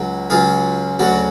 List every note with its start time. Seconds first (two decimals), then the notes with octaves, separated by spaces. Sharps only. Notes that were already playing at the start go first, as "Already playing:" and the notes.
Already playing: C#2 C#3 F#3
0.30 C#2 C#3 F#3 F4 G#4
0.99 D2 C#3 F#3 D4 F#4